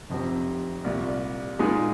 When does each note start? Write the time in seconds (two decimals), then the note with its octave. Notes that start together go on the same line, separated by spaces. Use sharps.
0.10 F1 F2 C3
0.84 C2 A#2 G3
1.59 A#2 G#3 D#4 G#4